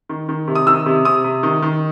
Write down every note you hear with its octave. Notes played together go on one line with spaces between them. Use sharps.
D#3
D#3
C3
D#6
D#3 E6
C3
C3 D#6
C3
D#3
D#3